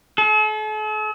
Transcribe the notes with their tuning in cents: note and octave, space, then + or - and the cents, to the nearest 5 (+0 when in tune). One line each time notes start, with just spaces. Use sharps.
A4 -45